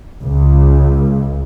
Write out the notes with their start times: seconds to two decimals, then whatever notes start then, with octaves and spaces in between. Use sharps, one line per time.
0.21 C#2